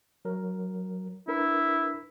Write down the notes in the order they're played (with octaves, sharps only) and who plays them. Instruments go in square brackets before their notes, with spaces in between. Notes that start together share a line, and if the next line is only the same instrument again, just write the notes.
[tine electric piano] F#3 A#4
[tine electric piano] D4 A#4 B4 [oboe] E4